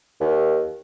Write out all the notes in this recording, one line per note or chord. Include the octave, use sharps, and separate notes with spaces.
D#2